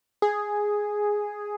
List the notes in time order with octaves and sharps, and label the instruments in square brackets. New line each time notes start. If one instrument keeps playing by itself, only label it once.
[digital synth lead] G#4